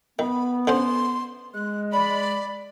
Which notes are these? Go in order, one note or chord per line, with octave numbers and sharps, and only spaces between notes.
D#3 B3 B5
D3 C#4 C5 C6
G#3 F#6
D5 B5